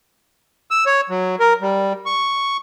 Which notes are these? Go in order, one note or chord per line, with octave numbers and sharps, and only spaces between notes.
E6
C#5
F#3
A#4
G3
C#6